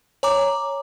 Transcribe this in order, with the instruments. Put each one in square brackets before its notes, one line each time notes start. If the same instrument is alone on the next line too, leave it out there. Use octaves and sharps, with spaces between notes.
[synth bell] C#5 G#5 A#5 D6